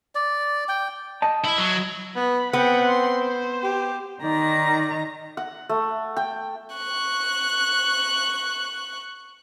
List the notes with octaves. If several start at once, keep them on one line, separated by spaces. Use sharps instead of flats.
D5
G5
D#5 A5
E4
F#3
B3 B5
B3 C4 F#5 G5
C6
C5
G4
D#3 D#4 D5 A#5
F#5
A3
G5
C#6 F#6